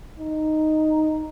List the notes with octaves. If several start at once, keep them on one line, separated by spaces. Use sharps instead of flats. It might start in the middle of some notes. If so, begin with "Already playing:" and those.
D#4